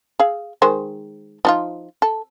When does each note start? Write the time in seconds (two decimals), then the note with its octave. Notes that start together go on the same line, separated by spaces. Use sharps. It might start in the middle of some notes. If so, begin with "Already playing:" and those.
0.20 G#4 F5
0.62 D#3 G#3 C5
1.45 F3 D#4 F4
2.02 A4